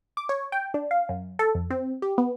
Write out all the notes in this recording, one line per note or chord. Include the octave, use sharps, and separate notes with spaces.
D6
C#5
G5
D4
F5
F#2
A4
F2
C4
G4
B3